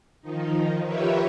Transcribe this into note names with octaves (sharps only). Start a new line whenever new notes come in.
D#3 F3 D#4
F4 G4 A#4 B4 C#5 E5